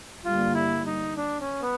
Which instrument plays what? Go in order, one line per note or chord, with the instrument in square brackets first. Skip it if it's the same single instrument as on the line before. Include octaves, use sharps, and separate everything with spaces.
[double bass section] G2 D3 G3 A#3 [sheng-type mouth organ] F4
[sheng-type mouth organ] E4
D#4
D4
C#4
B3